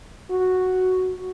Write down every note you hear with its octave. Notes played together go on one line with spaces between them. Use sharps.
F#4